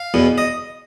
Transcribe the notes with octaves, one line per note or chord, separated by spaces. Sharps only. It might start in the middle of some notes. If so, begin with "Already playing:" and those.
Already playing: F5
E2 B2
D#5